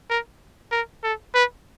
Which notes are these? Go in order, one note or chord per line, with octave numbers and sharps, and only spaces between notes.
A#4
A#4
A4
B4